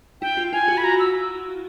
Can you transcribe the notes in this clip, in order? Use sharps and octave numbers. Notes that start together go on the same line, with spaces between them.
E4 G5
F4
F4 G#5
F#4
B5
A#5
E6